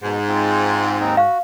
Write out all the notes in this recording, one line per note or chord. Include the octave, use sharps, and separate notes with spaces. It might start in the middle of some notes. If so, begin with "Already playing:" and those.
G#2 B2
C4 F4
D#2 C4 D#4
F#4 F5